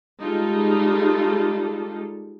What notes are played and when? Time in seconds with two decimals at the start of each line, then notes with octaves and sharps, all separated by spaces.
0.21 G3 G#3 D#4 F4 A4